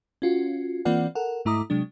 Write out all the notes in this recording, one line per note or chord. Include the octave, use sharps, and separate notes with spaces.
C#4 F4 F#4
E3 A#3 C4 F4 D5 F#5
A4 A#4 F#5
G#2 A3 E4 A#5 D6 D#6
C3 F#3 G#3 D4